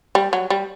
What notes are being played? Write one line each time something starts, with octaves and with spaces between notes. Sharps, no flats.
G3
F#3
G3